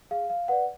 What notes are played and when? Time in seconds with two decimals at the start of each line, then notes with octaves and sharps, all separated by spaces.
0.11 G#4 F5
0.30 F5
0.48 B4 D5 F#5